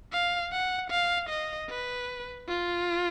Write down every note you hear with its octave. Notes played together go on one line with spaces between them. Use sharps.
F5
F#5
F5
D#5
B4
F4